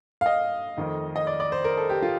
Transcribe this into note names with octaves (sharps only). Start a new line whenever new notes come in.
F5
D#5
F2 D#3 A3
D#5
D5
D5
C5
A#4
A4
G4
F4